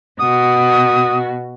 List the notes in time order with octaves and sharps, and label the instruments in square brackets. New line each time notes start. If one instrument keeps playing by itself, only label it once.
[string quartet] B2 F#4 [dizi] D#6